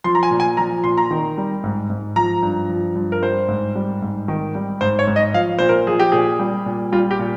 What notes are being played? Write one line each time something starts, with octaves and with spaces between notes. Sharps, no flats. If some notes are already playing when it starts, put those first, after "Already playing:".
F3 C6
A#5
G#5
A#2
G#5
F3 A#5
A#2 C6
A#5
D#3
G3
G#2
G#2
F3 A#5
G2
F3
G2
A#4
G3 C5
G#2
G3
G#2
D#3
G3
G#2 C5
C#5
G#2
D#5
F3 F5
A#2 C5
A#4
F3 G#4
G4
A#2 G#4
G3
A#2
G3 F4
G4
A#2